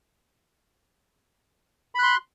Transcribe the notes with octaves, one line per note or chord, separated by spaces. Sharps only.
B5 C6 F#6